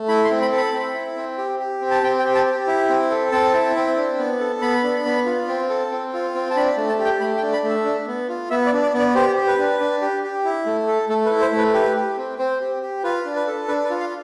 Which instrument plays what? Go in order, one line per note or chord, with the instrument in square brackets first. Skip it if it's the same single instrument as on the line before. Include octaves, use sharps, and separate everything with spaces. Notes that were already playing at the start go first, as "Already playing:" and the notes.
Already playing: [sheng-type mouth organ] A3
E4 B5
C6
C4
B5
A4
B5
C4
E4
C4
G4
G4
C4
A5
C4 G5
G5
G4
A5
G4
E4
C4
A4
C4 A5
E4
C4
D4
B3
A4
B3 B5
D4
B3
F4
C4
A4
C4
F4
C4
A5
D4 B5
A3
A5
G4
G5
A3 B5
G5
D4
B5
A3
E5
D4
B3
F4
B3 E5
D5
D4
D5
B3
D5
G4 C5
G4
B4
D4
D4
G4
G4
E4
A3
A4
A3 A4
B4
E4
C5
A3
B4
G4 B4
G4
C4
C4 C5
G4
G4
F4 B4
D4
B4
A4
D4 B4
B4
F4
F5